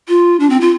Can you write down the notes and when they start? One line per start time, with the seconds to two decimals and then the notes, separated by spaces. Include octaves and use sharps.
0.08 F4
0.40 D4
0.50 C4
0.61 F4